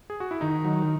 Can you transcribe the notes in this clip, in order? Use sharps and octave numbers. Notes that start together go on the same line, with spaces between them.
G#4
F#4
E4
D#3 D#4
F#3